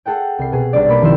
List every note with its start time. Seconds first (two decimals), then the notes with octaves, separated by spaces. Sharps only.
0.05 G#4 A4 F#5 G5
0.38 C2 C7
0.52 B2 G#4
0.73 B1 G3 D4 D5
0.88 B2 A#3 B5 D6
1.01 C2 D#3 F3 E4 C6 E7